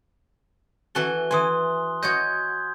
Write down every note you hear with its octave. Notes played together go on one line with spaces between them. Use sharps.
E3 F#4 A4 G#5 F#6 G7
E3 G#5 C6 D#6
F#4 C#5 D#5 G6 G#6